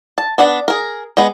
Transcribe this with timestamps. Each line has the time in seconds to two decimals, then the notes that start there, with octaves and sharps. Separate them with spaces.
0.18 A5
0.38 B3 D4 F#5 A5
0.68 G#4 A#4
1.17 G#3 B3